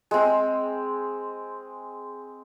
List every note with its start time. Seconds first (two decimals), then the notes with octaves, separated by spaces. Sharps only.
0.11 G#3 C4